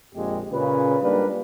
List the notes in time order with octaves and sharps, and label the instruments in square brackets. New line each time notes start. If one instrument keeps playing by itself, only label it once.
[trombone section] A#1 F2 A#2 G#3 C4 G4
A#2 C#3 B4
G#2 G3 A#3 D4 A#4 B4